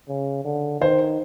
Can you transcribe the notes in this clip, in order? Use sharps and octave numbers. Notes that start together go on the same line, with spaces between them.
C#3
D3
D#3 C5